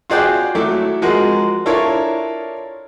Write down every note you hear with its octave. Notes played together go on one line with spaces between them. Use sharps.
F4 F#4 G#4 D5 F#5 G5
F#3 A3 E4 D6
F3 G#3 F#4 A#4
D4 E4 F4 A4 A#4 C#5